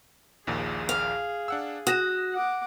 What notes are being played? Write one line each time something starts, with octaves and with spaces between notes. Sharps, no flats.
A#1 D#2 A#2 G#4
F5
D4 F#5 E6
F#4 D#6 A#6 E7
F#5 D6